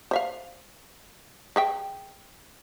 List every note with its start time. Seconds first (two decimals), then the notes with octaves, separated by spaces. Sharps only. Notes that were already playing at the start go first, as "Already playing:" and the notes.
0.11 C5 E5 F5
1.56 G#4 E5 G5